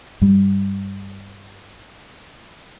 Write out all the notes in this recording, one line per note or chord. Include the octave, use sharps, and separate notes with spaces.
G2 G3